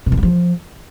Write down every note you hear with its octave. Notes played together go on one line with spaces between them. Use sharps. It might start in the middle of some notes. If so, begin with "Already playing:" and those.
C3
D#3
F#3
F3